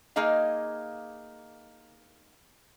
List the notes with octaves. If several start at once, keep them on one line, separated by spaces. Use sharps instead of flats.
A#3 D#4 G#4 D#5 F5